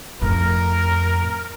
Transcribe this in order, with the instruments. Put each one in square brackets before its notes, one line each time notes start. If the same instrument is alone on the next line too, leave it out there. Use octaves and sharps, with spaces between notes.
[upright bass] F2 A2 [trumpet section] A#4